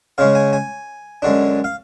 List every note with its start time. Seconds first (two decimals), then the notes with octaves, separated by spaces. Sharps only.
0.18 C#3 G#3 C#4 F5
0.35 G#5
0.53 G#5
1.22 F#2 D3 G#3 D4
1.64 F5